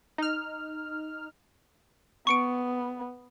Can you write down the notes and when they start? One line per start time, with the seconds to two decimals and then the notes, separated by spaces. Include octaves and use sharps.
0.18 D#4 F6
2.27 B3 C#6 C#7 D7